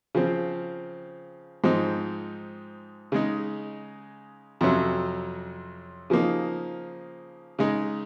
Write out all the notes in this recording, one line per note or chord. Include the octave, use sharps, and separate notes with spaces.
C#3 F3 C4
G#2 F3 C4 D#4
C#3 G#3 D#4
F2 C3 F#3 C#4
C#3 F3 A#3 D#4
C#3 G#3 D#4